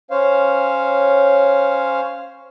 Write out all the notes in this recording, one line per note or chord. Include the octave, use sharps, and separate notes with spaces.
C#4 C5 C#5 F5